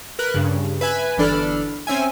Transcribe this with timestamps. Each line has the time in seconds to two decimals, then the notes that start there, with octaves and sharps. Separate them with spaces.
0.19 A#4 B4 F#6
0.34 G2 C#3
0.81 B4 E5 G#5 B5
1.17 G1 E3 D4 A4 B5 F6
1.87 C4 C#4 E5 G#5